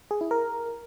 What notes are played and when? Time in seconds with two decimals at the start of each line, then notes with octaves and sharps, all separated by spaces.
0.11 G#4
0.21 E4
0.31 A#4